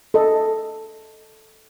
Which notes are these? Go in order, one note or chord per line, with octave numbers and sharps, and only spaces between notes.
A4 D#5